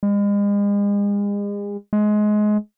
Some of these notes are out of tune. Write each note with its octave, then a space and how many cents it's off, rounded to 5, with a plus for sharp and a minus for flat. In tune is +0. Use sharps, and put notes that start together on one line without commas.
G#3 -40
G#3 +20